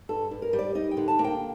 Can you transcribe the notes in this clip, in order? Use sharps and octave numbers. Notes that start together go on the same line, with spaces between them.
G2 A4
G2
A#4
G3
D5
D#4 D#5
G5
D3
A5
A#3
G5